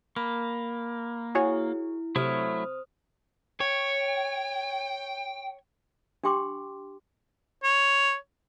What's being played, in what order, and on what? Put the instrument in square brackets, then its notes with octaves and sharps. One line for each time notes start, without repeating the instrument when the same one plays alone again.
[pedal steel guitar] A#3 [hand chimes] B5
[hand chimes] E4 [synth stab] F#4 G#4 C#5
[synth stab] C3 [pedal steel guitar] F#3 A3 E4 [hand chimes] C5 D#6 F6
[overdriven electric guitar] C#5 [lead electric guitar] G5
[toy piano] D4 G4 G5 C6 D6
[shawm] C#5